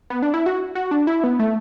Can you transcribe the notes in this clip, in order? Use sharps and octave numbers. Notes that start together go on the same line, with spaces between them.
B3
D4
E4
F#4
F#4
D4
E4
B3
A3